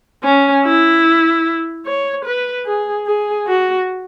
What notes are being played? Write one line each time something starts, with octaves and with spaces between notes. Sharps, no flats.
C#4
E4
C#5
B4
G#4
G#4
F#4